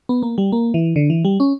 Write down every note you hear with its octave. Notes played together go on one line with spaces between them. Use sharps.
B3
A#3
G3
A#3
E3
D3
E3
G3
C#4